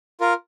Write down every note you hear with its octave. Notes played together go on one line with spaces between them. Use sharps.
F4 A#4